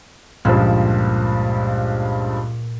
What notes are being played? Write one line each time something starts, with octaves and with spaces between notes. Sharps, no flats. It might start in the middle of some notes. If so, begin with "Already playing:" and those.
C#2 G2 A#2 F3